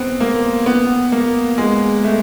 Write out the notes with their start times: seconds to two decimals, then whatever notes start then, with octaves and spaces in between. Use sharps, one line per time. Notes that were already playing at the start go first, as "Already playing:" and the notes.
Already playing: B3 C4
0.20 A#3
0.66 B3
1.12 A#3
1.58 G#3
2.04 A3